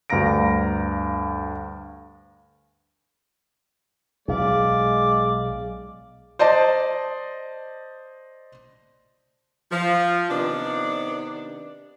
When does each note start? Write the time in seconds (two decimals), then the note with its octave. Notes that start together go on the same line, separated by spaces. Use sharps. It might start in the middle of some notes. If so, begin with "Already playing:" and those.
0.10 D2 G2 F5 A#5 A#6 D7
4.28 B1 G#3 G#4 D5 F5
6.39 C5 D5 D#5 A5
9.71 F3
10.30 C3 D#3 B3 D4